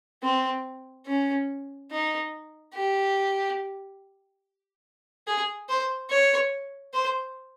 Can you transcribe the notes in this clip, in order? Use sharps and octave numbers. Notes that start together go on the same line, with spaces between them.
C4
C#4
D#4
G4
G#4
C5
C#5
C5